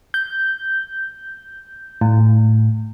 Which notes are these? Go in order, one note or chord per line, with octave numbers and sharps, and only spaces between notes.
G6
A2